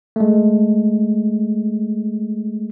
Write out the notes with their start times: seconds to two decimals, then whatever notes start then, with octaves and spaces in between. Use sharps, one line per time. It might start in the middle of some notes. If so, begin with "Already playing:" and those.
0.16 G#3 A3